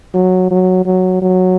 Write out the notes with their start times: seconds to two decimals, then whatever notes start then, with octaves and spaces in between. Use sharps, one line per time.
0.14 F#3
0.51 F#3
0.86 F#3
1.22 F#3